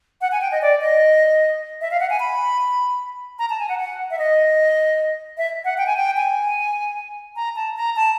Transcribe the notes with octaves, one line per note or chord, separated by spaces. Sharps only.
F#5
G#5
G5
D#5
D5
D#5
E5
F5
F#5
G#5
B5
A#5
A5
G#5
F#5
F#5
E5
D#5
E5
F#5
G5
G#5
G5
G#5
A#5
A5
A#5
A5